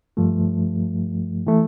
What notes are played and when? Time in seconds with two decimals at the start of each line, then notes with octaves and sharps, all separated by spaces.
0.17 G2 F3 A3
1.47 E3 A3